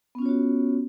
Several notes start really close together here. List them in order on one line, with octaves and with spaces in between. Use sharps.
B3 C#4 F4 C#5 F#4